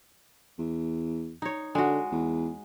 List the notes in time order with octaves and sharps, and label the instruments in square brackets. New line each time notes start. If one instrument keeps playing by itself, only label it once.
[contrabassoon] E2
[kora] D#4 C#5
[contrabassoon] D3 [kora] G#3 F#4
[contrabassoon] E2